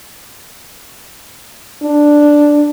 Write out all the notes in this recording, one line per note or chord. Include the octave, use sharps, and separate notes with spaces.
D4